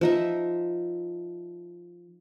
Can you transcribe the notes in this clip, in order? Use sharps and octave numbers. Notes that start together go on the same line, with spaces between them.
F3 D#4 E5